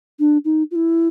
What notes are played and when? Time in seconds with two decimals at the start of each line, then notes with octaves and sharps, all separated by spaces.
0.19 D4
0.45 D#4
0.71 F4
0.76 E4